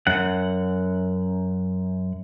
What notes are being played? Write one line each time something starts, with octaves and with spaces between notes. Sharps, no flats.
F#2 F#5